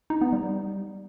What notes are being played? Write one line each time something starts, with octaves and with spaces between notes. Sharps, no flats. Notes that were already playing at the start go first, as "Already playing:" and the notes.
D#4
B3
G3